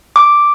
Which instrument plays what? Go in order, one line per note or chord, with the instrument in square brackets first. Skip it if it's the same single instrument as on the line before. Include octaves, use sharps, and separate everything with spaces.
[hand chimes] D6